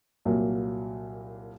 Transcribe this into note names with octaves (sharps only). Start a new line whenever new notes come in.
C2 A#2 F#3 A#3